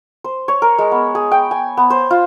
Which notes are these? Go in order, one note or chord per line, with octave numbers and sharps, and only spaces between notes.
C5
C#5
A#4
G#3
B3
G#4
G5
G#5
B3
C5
F4